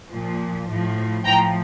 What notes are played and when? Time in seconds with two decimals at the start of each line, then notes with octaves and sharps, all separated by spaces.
0.11 A#2 F3
0.68 A2 F3
1.25 A2 F3 G5 A#5